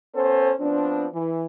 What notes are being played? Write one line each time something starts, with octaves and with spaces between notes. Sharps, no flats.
B3 C#4 A4 C5
F3 B3 C4 D4
E3